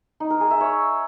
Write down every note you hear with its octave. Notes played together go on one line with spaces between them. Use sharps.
D#4
A#4
G#4
E5
C#5